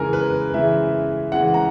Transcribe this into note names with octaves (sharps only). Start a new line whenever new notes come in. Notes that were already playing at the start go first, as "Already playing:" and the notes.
Already playing: C#3 E3 G#3 A#4 G#5
B4
C#3 E3 G#3 E5
C#3 E3 G#3 F#5
A#5